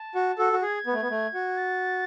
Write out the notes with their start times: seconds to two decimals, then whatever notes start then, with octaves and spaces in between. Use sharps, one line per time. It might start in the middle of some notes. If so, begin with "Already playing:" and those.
Already playing: A5
0.15 F#4
0.38 F#4 A4
0.53 F#4
0.62 G#4 G#6
0.86 B3
0.93 A3
1.02 B3
1.11 A3
1.34 F#4
1.57 A6